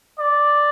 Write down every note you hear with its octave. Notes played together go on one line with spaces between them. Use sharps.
D5